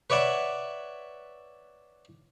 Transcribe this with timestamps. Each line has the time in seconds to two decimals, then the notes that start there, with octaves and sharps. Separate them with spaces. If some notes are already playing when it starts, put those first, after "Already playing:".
0.10 B4 C#5 D5 E5 F#5